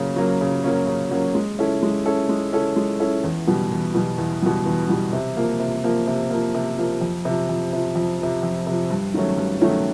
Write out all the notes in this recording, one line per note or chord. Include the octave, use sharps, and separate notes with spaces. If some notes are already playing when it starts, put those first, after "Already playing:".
Already playing: C#3 F#3 A#3 C#4
F#3 A#3 C#4
C#3
F#3 A#3 C#4
C#3
F#3 A#3 C#4
G#3
C#4 E4 A4
G#3
C#4 E4 A4
G#3
C#4 E4 A4
G#3
C#4 E4 A4
E2
B2 G3
E2
B2 G3
E2
B2 G3
E2
B2 G3
C3
F3 A#3
C3
F3 A#3
C3
F3 A#3
C3
F3 A#3
F2
C3 F3
F2
C3 F3
F2
C3 F3
F2
C3 F3
G2
D#3 F#3 A3 C#4
G2
D#3 F#3 A3 C#4